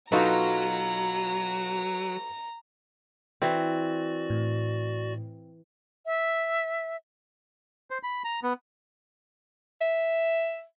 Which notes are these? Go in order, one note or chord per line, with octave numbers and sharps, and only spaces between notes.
B2 F#3 D#4 F4 F#4 A4 B4 A#5
E3 C4 F#4 D5
A2
E5
C5
B5
A#5
B3
E5